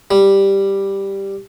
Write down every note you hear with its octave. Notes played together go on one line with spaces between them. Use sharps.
G3